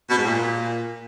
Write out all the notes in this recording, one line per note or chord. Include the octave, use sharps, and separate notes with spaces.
B2
G#2
A#2